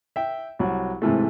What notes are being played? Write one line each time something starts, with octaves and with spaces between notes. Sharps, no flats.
E5 G5
C2 F#3 F#4
G#2 C3 E3 A3